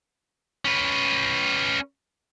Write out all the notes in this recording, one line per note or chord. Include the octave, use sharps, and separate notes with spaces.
C#4 B4